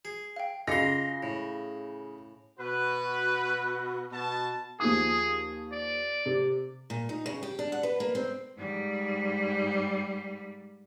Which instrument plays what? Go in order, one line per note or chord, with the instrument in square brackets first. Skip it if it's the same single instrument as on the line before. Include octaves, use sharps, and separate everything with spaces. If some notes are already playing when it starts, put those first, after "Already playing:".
[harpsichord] G#4
[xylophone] F5 G5
[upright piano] C#3 [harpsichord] F4 C6 [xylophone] D#5 D6 C#7 [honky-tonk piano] A#6
[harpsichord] A2
[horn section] B2 F#4 B4
B2 A5
[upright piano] D#2 F3 D#6 [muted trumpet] G#4
[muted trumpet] D5
[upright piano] C3
[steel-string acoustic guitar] A#2
D#4
C#3
G4
D4
F#5
B4
A#3
C4
[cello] G#2 G3